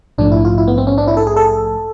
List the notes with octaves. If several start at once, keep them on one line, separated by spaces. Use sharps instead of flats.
A#1 G#2 F3 A3 D4
E4
F4
E4
B3
C4
C#4
D4
E4
A4
G#4
A4